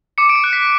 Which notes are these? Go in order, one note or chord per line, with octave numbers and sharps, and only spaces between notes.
D6 C#7
D7
C#7
F#6
B6